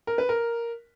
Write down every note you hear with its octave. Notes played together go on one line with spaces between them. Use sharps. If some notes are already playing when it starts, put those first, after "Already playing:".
A#4
B4
A#4